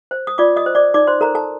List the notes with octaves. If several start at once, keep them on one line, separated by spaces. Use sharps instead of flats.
C5
D#6
F4 D5 D6
D#5 D#6
C5
D5 D6
D#4 D5 D6
C5 C6
A4 A#4 C5 A#5
A4 A5